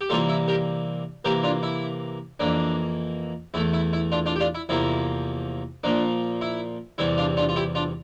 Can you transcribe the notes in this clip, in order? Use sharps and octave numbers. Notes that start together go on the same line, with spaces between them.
G4
C3 E3 G3 A#3 F4 A4
E4
G4 A#4
C3 E3 A#3 G4 A#4
D4 F4
E4
F2 E3 A#3 D4
E2 E3 A3 E4
E4
E4
D4 F4
D4 F4
G4
D4 F4
E4
E2 C3 F3 A#3 E4
A#2 F3 A#3 D4
E4
E2 C3 E3 G3 E4
D4 F4
D4 F4
F4
E4 G4
D4 F4